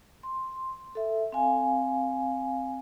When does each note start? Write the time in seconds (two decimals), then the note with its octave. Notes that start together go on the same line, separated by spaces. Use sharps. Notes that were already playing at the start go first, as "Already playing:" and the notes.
0.23 C6
0.95 A4 E5
1.32 C4 F5 G#5